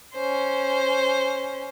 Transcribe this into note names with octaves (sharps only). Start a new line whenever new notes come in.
C#4 C5